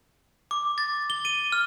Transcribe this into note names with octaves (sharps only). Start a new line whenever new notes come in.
D6
A6
G7
D#7
F6